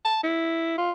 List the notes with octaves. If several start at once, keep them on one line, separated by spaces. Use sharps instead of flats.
A5
E4
F4